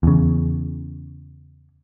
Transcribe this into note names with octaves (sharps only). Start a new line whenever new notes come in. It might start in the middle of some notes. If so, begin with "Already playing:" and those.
E2 C#3